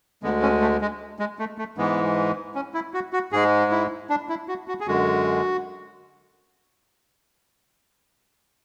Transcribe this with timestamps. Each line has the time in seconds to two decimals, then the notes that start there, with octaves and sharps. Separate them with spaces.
0.23 D2 D3 G#3 B3
0.42 C#4
0.62 A3
0.81 G#3
1.19 G#3
1.39 A3
1.58 A3
1.78 G#2 E3 G#3 B3
2.55 C#4
2.74 E4
2.94 F#4
3.13 F#4
3.32 G#2 G#3 G#4
3.71 E4
4.10 D4
4.29 E4
4.48 F#4
4.68 F#4
4.80 G#4
4.87 F#2 D3 G#3 F#4